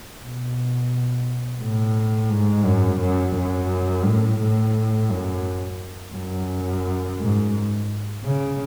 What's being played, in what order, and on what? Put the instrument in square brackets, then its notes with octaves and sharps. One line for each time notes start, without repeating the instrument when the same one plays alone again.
[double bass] B2
A2
G#2
F#2
F#2
F#2
A2
A2
F#2
F#2
G#2
C#3